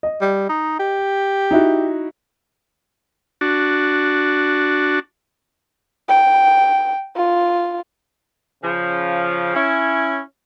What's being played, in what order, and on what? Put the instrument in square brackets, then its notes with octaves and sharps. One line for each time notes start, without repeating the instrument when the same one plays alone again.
[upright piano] D#5
[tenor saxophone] G3
D#4
G4
[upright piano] D#4 E4 F#4
[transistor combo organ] D4 F#4
[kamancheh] G5
F4
[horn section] C#3 F3
C#4 E4